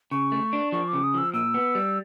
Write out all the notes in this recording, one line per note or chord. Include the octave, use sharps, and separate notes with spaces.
C#3 C#6
A3
D4
F3 C#6
D6
C#3
D#6
F3 E6
A#2 E6
B3
G3